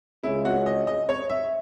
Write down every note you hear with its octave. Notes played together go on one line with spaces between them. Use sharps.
C#2 C#3 G#3 C#4 E4
F#4
D#5
D#5
C#5
E5